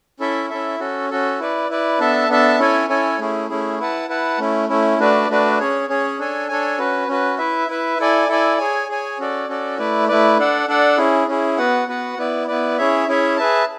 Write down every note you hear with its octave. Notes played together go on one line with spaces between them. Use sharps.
C#4 E4 A4 E5
C#4 E4 A4 E5
C#4 F#4 A4
C#4 F#4 A4
E4 B4 D5
E4 B4 D5
B3 D4 A4 E5 A5
B3 D4 A4 E5 A5
C#4 E4 A4 C#5 G#5
C#4 E4 A4 C#5 G#5
A3 C#4 E4 G#4
A3 C#4 E4 G#4
E4 B4 F#5 A5
E4 B4 F#5 A5
A3 C#4 E4
A3 C#4 E4
A3 D4 F#4 B4 D5
A3 D4 F#4 B4 D5
C#4 G#4 C#5
C#4 G#4 C#5
D4 A4 C#5 G#5
D4 A4 C#5 G#5
C#4 F#4 B4
C#4 F#4 B4
E4 B4 E5
E4 B4 E5
E4 A4 D5 G#5
E4 A4 D5 G#5
G#4 C#5 G#5
G#4 C#5 G#5
C#4 F#4 A4 D5
C#4 F#4 A4 D5
A3 E4 B4 D5
A3 E4 B4 D5
D4 A4 D5 F#5
D4 A4 D5 F#5
C#4 E4 G#4
C#4 E4 G#4
B3 F#4 B4 F#5
B3 F#4 B4 F#5
B3 E4 B4 D5
B3 E4 B4 D5
C#4 E4 G#4 C#5 E5
C#4 E4 G#4 C#5 E5
G#4 B4 E5 A5